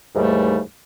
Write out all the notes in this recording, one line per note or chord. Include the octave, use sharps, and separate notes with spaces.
D#2 G#2 E3 G3 A3